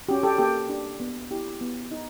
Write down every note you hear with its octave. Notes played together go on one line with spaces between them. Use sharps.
C#4 F#4 G4
G4 A4
A#3 G4 A4
D4 G4
B3
E4 G4
B3
D#4